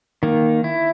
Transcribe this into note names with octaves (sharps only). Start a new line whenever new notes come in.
D#3 A#3
E4